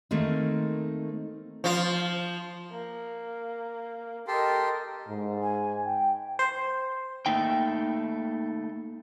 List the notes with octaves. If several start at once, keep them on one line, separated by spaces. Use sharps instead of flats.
D#3 A3 A#3 C4 D#4
F3 F4
A#3
G4 A4 A#4 D#5 C6
G#2
G#5
G5
C5
A3 A#3 D#4 G5